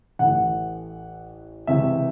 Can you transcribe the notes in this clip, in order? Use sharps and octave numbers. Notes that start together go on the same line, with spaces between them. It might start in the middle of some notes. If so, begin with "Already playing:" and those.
A1 A2 E3 F#5
C#2 C3 E3 E5